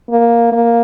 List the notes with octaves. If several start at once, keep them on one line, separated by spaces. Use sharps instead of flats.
A#3
A#3